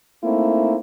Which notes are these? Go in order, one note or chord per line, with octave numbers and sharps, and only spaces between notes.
A3 A#3 C4 D#4 E4